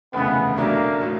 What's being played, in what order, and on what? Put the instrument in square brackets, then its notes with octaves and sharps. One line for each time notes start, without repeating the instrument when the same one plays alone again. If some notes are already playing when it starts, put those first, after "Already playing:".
[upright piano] F1 D#2 C#3 E3 [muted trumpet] B3
[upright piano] B1 B2 F#3 A3 D4 [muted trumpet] A#3
[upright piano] A2 F#3 A#3